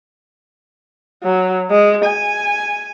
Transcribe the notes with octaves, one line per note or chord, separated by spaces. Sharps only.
F#3
G#3
G#5